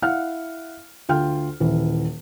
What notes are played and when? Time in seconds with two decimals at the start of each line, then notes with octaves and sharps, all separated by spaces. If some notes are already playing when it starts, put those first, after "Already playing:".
0.02 E4 F5 F#5 F6
1.09 D2 F4 G5 F6
1.60 D#1 E3